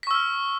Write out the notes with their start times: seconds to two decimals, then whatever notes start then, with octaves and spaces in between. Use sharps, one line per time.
0.03 B6
0.07 C#6
0.11 E6
0.14 F6